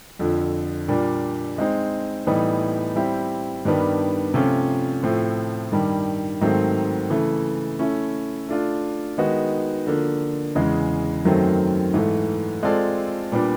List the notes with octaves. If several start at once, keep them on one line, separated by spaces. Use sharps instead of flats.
F2 D3 F3
A#2 G3 A#3 D4
G#3 C4 D#4
A2 E3 G3 B3 D#4
G3 C4 E4 G4
G2 D#3 G3 B3 D4
C3 F3 A3 C#4 F4
A2 F3 A3 C4
G2 D#3 G3
G#2 D#3 F#3 A3 C4
C#3 E3 A3
A3 C#4 E4
A3 D4 F4
D#3 G#3 B3 D#4 F#4
D3 F3 A#3
E2 C#3 E3 G#3
F#2 D#3 F#3 A3 C4
G#2 E3 A3
G#3 C4 F4 A4 D5
A#2 G3 B3 D4